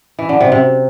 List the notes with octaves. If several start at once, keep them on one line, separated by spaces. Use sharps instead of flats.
E3
D3
C3
C3